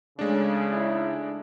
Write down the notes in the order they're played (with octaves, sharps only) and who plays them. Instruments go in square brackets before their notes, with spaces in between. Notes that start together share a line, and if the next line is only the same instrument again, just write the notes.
[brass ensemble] C#3 [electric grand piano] G#3 A3 D4
[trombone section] D#4 E4